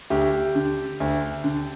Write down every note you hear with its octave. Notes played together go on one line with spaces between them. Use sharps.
D2 G4
D3
D2
D3